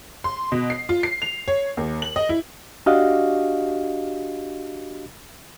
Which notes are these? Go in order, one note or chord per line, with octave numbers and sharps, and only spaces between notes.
C6
B2
C7
F4
C7
F7
C#5
D#2
F#7
D#5
E4
D4 F#4 G4 D#5 F5